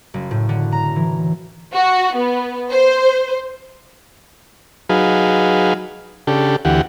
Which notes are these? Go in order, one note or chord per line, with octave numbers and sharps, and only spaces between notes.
F#1
A2
D3
A#5
E3
F#4
B3
C5
F#3 D#4 G#4 B4 F5
C#3 D4 G4 A4
D2 E3 G4 F#5